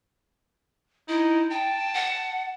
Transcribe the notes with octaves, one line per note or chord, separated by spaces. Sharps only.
D#4 E4
G5 A5
F#5